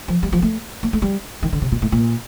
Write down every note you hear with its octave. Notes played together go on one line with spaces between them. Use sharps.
F3
G3
F3
A3
A#3
A3
G3
D#3
D3
C3
A#2
A2
A#2